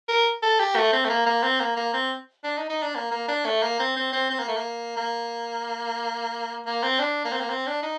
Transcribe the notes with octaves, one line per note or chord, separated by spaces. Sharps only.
A#4
A4
G4
A3
C4
A3
A#3
A#3
C4
A#3
A#3
C4
D4
D#4
D#4
D4
A#3
A#3
D4
A3
A#3
C4
C4
C4
C4
A#3
A3
A#3
A#3
A#3
C4
D4
A#3
C4
A#3
C4
D4
D#4